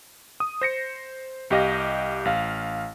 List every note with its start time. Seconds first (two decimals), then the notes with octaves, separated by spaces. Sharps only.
0.40 D#6
0.61 C5 A#6 C#7
1.51 C2 G4 D#5 F5 A#6
2.25 A1 F5